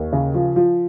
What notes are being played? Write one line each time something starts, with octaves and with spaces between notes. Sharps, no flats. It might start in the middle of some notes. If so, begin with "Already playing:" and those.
Already playing: D#2
C#3
F3
F3